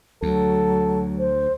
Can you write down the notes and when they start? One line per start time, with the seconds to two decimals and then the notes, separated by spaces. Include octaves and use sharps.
0.22 D2 F#3 A4
1.19 C5